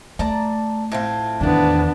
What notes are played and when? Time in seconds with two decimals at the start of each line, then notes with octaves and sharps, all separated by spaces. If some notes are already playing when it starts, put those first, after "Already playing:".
0.19 A3 D5 A5 A#5
0.92 A2 C4 F4
1.41 E2 D#3 B3 D4